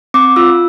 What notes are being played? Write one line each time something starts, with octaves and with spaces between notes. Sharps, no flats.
C4 D6
F4 E6